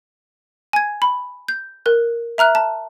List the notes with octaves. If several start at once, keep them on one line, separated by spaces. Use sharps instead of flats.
G#5 G#6
B5
G6
A#4 F#6
E5 A#5 F6 F#6
A5